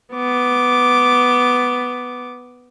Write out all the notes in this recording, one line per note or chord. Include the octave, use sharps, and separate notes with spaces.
B3 D6